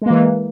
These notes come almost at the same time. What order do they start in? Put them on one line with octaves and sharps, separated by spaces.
G#3 A#3 E3